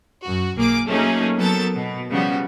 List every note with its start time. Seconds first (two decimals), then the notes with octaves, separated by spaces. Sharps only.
0.24 F#2 F#4
0.56 B1 A#3 G#4 D6
0.86 F#3 A3 A#3 C#4 D#4 G#4
1.38 F#3 B3 A4 A#4 G6 A6
1.75 B2
2.11 C#3 F3 G3 B3 F#4